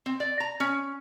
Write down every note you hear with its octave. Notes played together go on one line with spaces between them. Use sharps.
C4
D5
A#5
C#4